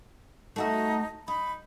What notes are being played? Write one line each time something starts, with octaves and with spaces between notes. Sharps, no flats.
A3 D#4 F#4 E5
D#4 B5